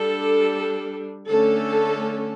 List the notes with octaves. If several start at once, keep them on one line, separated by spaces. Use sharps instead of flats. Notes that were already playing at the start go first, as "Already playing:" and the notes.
Already playing: G3 D4 A4
D3 A3 C#4 A4